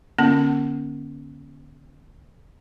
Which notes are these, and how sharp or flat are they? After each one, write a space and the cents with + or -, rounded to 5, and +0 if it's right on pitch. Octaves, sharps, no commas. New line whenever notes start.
D3 +0 A#3 +45 C#4 +0